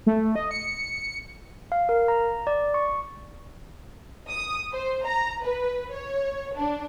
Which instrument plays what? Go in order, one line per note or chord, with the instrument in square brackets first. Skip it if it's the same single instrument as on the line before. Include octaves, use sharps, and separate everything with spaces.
[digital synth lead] A3
D#5
C#7
[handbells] F5
A#4
A#5
D5
C#6
[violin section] D#6
C5
A#5
B4
C#5
D4